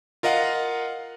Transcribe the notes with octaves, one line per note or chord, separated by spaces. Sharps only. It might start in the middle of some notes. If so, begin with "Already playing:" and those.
F4 A#4 D#5 F5 F#5